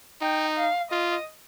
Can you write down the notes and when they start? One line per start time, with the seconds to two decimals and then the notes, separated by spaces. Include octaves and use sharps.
0.21 D#4 G5
0.57 F5
0.91 F4 D#5